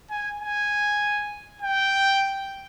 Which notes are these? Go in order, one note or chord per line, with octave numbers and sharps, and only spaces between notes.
G#5
G#5
G5